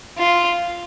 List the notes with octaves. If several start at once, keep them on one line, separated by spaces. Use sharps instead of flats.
F4